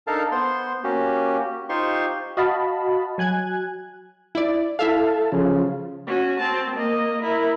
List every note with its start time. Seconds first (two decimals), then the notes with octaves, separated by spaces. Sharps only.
0.07 D4 D#4 A4 A#4 F5 A5
0.32 B3 C5 C6
0.84 A#3 C#4 F#4 G4
1.69 D#4 F4 G4 C5 C6 C#6
2.37 F#4 D#5 F5 A5 B5
3.18 F#3 G#5 F#6 G#6
4.35 E4 D5
4.79 E4 A4 E5 F5
5.32 C#3 F3
6.07 C#4 F#4
6.40 C4 A5
6.76 A#3 D#5
7.22 E4 A#4